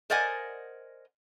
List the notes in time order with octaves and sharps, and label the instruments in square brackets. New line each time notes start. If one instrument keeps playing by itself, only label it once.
[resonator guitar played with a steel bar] A#4 C5 D5 D#5 F#5 G#5